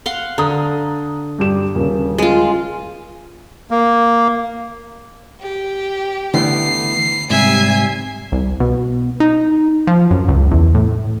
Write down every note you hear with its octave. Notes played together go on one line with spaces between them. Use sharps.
F5 F#5 C6
D3 A#5 D#6
G2 G4 E7
D#1 C#3
G#3 F4
A#3
G4
D3 E3 A3 B3 C7
G#2 C3 G3 E5 G#5 G#6 C7
C2
B2
D#4
F3
F#2
C#2
E2
A2